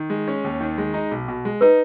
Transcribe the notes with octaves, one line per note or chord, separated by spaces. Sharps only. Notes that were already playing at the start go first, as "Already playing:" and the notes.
Already playing: D#3
G#3
C#4
D#2
D#3
G#3
D#4
B1
B2
G#3
D#4 B4